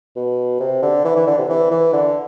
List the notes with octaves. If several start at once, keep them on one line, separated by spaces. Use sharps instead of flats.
B2
C3
D3
E3
E3
D3
C3
E3
E3
D3